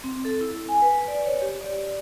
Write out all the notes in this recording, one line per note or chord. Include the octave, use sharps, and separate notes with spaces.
C4
A4
E4
G#5
B4
D5
C#5
G4
D5